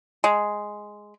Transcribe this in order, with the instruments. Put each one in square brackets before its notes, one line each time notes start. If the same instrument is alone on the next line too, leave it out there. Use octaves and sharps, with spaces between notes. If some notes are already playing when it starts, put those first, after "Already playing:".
[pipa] G#3